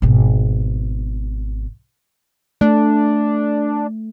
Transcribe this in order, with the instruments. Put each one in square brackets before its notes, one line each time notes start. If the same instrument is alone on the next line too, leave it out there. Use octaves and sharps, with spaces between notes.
[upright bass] G#1 B2
[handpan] A3 [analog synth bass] D4